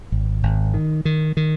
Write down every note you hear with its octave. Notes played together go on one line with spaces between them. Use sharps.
G#1
G#1
D#3
D#3
D#3